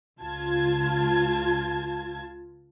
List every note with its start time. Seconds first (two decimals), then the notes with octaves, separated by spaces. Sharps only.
0.20 C#2 F4 A5 G#6